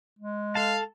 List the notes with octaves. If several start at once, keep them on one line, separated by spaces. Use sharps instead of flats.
G#3
A4 F5 A5